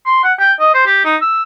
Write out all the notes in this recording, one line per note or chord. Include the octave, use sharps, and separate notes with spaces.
C6
F#5
G5
D#5
C5
G4
D#4
E6